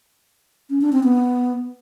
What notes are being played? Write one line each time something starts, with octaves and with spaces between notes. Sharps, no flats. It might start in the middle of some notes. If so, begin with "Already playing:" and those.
C#4
D4
C4
B3